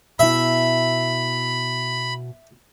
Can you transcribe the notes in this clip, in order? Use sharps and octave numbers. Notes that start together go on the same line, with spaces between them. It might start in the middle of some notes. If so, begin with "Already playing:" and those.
B2 E4 E5 B5